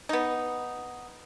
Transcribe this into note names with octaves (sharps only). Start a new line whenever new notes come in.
B3 D#4